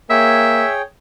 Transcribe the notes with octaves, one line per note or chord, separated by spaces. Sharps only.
A#3 G#4 C#5 E5 G5